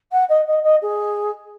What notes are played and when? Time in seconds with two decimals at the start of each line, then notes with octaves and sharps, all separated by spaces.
0.12 F#5
0.29 D#5
0.47 D#5
0.63 D#5
0.82 G#4